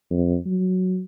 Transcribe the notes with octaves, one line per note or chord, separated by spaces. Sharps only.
F2
F#3